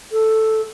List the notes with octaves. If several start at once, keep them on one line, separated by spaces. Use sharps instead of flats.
A4